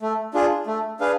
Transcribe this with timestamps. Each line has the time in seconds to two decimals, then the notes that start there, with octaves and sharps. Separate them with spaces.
0.02 A3
0.34 D4 F4 G#4
0.67 A3
1.00 D4 G#4 B4 F5